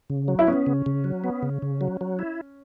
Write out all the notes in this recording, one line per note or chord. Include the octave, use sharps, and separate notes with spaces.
C#3
F#3
E4
B3 C#4
C#3
C#3
F#3
B3
C#3
C#3
F#3
F#3
E4